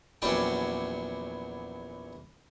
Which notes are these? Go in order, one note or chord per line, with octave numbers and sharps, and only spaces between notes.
A#1 E2 F#3 C#4 D5 G5